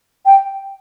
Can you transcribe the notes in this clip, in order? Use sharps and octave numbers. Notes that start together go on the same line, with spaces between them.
G5